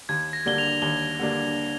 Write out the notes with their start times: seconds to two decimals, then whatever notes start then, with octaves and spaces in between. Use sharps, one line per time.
0.09 D#2 G#6
0.33 A#6
0.46 D3 G3 A#3 D4 G7
0.58 F7
0.82 D#2 G7
1.19 D3 G3 A#3 D4